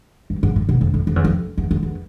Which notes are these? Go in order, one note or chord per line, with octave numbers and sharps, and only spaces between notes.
G2
G#2
A2
B2
F2
F2
F2
E2
F2
E2
F2
E2